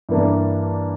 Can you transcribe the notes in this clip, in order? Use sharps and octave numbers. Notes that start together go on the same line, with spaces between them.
G2 E3 A#3 D4